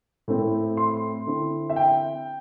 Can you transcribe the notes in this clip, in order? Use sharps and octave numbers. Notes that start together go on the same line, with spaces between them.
A2 A3 C4 E4
C6
D3 C4 E4
E5
G5